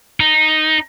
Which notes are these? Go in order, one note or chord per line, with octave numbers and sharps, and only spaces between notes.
D#4